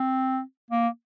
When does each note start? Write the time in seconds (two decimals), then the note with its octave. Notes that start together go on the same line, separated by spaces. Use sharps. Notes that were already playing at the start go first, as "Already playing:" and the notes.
Already playing: C4
0.71 A#3